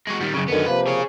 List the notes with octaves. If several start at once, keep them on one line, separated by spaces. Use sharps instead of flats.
G#3 F#4
D#3 G3
F#2 C#3
F#2 D3 D#3 B3 C#4
C3 F3 A#3 B4
G#4 C#5